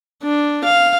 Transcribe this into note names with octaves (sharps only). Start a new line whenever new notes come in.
D4
F5